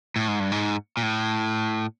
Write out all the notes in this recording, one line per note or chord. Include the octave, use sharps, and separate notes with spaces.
A2
G#2
G2
G#2
A#2
A2